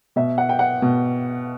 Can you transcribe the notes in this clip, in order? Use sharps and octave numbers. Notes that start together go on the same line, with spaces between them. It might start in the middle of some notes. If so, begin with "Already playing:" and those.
B2 E5
F#5
G5
F#5
B2